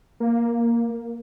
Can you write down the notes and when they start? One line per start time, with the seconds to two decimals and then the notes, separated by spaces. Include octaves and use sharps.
0.20 A#3